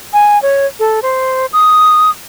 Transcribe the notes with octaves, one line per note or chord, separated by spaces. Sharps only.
G#5
C#5
A4
C5
D#6